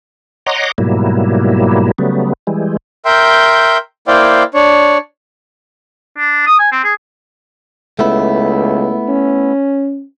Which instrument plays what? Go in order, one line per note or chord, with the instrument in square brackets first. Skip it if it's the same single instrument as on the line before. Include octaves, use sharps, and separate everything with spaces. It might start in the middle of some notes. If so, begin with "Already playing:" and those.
[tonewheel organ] C#5 D#5 F#5 A#5 C6 D6
G#2 B2 F#3 G3 A#3 E4
C#3 F#3 G3 A3 B3
E3 G3 G#3
[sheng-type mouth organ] A#4 E5 G5 C6 G6
A#3 E4 C5 D5 F5 G5
D4 C#5
[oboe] D4
D#6
G#5
C4
G#4
[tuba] C#2 [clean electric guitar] A3 B3 E4
[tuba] C#4